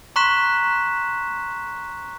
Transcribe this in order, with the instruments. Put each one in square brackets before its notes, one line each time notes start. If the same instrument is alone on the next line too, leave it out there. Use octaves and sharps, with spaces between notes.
[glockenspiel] A#5 C6 C#6 F#6 B6 E7